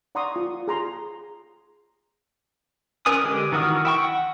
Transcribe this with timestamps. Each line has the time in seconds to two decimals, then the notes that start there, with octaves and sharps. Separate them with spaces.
0.15 D5 F#5 A#5 C6 C#6 D#6
0.36 F4
0.68 G#4 A#5 C6
3.06 C#4 A#4 B4 G#5 D#6
3.23 D3 G#3 G4
3.52 D#3 E3 F#4 D#6 F6
3.85 E4 G5 C#6
4.00 F#5